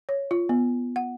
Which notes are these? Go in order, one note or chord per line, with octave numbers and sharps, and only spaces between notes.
C#5
F4
B3
F#5